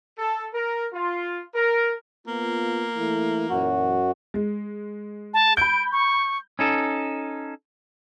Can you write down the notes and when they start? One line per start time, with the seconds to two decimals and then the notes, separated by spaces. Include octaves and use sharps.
0.18 A4
0.54 A#4
0.93 F4
1.54 A#4
2.27 A#3 B3 F4
2.96 E3 A3 E4
3.50 F#2 A#2 E3 F#3 F#4
4.34 G#3
5.34 A5
5.57 B5 G6 D7
5.92 C#6
6.59 C#4 D#4 A4